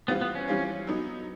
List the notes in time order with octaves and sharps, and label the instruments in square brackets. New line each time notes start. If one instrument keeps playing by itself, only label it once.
[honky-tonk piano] E3 G3 C4 F4 [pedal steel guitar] B3
[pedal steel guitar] B3
C#4
[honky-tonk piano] E3 G3 C4 F4
F#3 B3 D#4